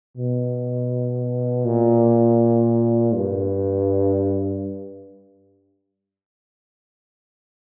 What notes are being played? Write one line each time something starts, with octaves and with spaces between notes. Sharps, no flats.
B2
A#2
G2